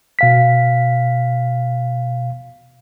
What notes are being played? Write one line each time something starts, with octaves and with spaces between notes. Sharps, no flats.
B2 F5 B6